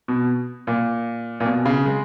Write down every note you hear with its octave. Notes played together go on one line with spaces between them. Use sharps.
B2
A#2
A#2
B2
C#3
G#3